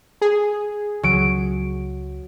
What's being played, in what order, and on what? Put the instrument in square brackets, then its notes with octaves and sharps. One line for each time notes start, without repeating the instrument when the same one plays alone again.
[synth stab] G#4
[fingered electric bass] C#2 [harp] F#3 D7